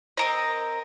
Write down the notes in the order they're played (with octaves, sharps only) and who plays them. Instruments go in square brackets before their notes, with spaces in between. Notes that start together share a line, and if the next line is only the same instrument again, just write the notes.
[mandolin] C4 A#4 D#5